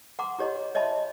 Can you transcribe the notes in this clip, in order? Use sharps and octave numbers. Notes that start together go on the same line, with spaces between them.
F#5 A#5 C6 D6
E4 G4 C#5 D#5 A#5 C6
C#5 D#5 E5 A5 B5 C6